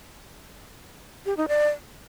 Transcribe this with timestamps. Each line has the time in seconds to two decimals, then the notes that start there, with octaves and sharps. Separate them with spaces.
1.26 G4
1.37 D#4
1.48 D5